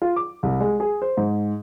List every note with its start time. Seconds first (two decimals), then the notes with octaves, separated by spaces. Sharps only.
0.02 F4
0.16 D6
0.43 C2
0.61 G#3
0.80 G#4
1.02 C5
1.17 G#2